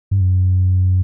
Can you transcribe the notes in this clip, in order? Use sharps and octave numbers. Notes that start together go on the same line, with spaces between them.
G2
F#2